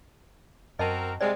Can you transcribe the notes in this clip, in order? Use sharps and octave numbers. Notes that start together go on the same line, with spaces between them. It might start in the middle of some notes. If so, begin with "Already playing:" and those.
F#2 C4 F#4 A#4 D#5 A5
C3 G3 G#3 C5 D5